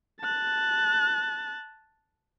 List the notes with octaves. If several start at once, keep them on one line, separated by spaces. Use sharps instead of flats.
A5 F#6